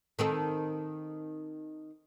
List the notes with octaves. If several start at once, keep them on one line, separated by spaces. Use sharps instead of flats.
D#3 C4 A4